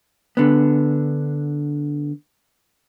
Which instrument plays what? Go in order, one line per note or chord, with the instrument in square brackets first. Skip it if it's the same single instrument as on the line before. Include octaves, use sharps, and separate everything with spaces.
[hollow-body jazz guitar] D3 B3